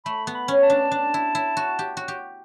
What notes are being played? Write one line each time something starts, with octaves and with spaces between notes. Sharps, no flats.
A3 B5
B3
B5
C#4
A5
D4
D4
E4
E4
F#4
G4
F#4
G4